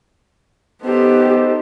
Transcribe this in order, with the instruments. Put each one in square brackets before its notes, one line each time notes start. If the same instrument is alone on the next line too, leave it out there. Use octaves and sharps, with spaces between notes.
[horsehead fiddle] B3 G4 [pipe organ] D#4 A4 C5